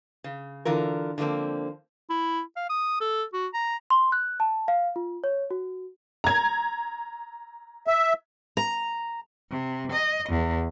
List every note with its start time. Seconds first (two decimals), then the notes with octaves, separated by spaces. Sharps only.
0.24 C#3
0.65 D3 E3 F4 A#4
1.18 D3 F3 A3 A#3 C4
2.10 E4
2.56 F5
2.70 D#6
3.00 A4
3.33 F#4
3.54 A#5
3.90 C6
4.12 F#6
4.40 A5
4.68 F5
4.96 F4
5.24 C#5
5.51 F#4
6.24 A#5 G#6
7.87 E5
8.57 A#5
9.51 C3
9.92 D#5
10.29 E2